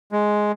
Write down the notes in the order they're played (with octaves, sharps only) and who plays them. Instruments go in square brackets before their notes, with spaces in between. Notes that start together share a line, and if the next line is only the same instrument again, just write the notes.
[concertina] G#3